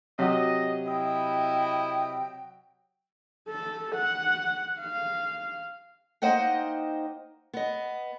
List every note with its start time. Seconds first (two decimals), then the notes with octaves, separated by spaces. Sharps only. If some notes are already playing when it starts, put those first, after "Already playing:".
0.19 C3 F#3 F#4 D#5
0.87 E4 D#5 G5
3.49 A4
3.96 F#5
4.81 F5
6.22 A#3 D#4 C5 D#5 F#5 G5
7.53 B3 D#5